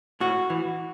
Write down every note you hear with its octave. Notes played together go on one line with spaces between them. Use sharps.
A2 F#4
E3